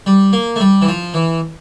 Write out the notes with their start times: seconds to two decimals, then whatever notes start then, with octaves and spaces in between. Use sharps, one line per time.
0.06 G3
0.33 A#3
0.56 A3
0.60 G3
0.82 E3
0.88 F3
1.14 E3